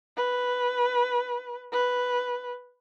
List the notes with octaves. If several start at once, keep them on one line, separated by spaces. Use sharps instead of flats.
B4
B4